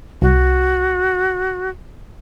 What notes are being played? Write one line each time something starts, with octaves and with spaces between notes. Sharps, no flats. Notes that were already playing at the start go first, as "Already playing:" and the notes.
C2 F#4